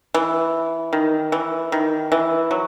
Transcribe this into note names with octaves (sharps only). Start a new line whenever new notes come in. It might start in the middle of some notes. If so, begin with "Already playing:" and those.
E3
D#3
E3
D#3
E3
F#3